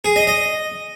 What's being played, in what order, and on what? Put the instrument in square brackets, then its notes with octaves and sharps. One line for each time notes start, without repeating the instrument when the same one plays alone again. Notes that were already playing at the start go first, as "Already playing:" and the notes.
[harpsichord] G#4
D#5
D#5